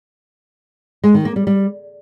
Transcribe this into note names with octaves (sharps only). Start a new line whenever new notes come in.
G#3
D#3
A#3
G3
G3